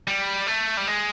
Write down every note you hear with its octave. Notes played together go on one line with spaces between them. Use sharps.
G3
A3
G3
G#3